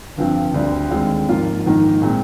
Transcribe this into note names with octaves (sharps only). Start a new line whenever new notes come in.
G1 G2 F3 C4
D2 D3 G3 D4
D#2 D3 G#3 C4 F4
G#2 F3 A#3 F4
A#1 G#2 D#3 A#3 D#4
A#2 G#3 C4 D#4